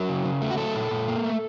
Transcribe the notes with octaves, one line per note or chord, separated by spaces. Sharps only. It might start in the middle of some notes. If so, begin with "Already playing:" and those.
Already playing: F#3 A#4
C#3
C#3
A3
F#4
F#3 A4
A#2
A#2
A#3
A3